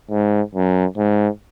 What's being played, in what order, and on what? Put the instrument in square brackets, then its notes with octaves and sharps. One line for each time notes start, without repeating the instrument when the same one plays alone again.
[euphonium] G#2
F#2
G#2